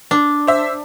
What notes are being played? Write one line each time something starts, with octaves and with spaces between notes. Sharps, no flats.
D4
C5 E5